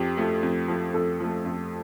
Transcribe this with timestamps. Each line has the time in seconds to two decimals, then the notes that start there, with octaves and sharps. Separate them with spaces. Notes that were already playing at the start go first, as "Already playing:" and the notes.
Already playing: F2 G4
0.17 F3 A3
0.43 F2
0.68 F3 A3
0.94 F2 A4
1.20 F3 A3
1.45 F2